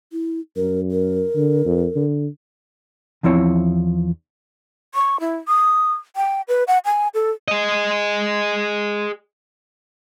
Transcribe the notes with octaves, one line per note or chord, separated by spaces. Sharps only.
E4
F#2 A#4
A#4
D3
F2
D3
E2 F3 C4 E4 C#5
C#6
E4
D#6
G5
B4
F#5
G#5
A4
G#4 D#5